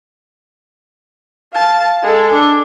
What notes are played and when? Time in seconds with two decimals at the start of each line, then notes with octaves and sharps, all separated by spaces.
1.53 F5 A5
2.02 G#3 A4
2.33 D4